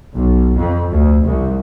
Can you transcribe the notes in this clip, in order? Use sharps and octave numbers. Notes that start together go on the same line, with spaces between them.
B1
F2
D2
C2